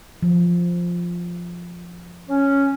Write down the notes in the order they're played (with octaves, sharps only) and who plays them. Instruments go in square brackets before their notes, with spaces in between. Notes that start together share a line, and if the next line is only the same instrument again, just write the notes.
[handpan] F3
[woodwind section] C#4